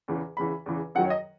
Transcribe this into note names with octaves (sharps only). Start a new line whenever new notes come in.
E2 C#3 E3
E2 C#3 E3 B5
E2 C#3 E3
F#2 D#3 F#3 F#5
C#5
D#5